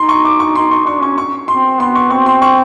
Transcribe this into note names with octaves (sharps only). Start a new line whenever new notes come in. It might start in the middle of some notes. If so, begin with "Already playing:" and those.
Already playing: D#4 C6
C#6
D6
C#6
D#4 C6
D#4 C#6
D4 C#6
C#4 C#6
C#6
C4 C6
B3 C6
C#6
C4 C#6
C6
C#6